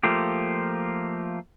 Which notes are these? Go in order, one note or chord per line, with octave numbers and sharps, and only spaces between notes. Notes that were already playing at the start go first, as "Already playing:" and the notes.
F3 A3 A#3 F4 G4